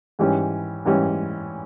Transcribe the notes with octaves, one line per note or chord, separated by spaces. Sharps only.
G#2 E3 G3 C#4 G4
G#2 E3 G3 C#4 G4